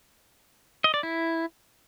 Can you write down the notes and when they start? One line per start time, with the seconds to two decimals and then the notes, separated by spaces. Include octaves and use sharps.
0.84 D#5
0.94 D5
1.03 E4